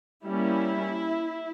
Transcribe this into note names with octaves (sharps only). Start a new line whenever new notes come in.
G3 A#3 C#4 E4